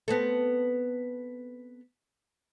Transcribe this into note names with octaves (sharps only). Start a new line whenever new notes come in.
B3 C4 A4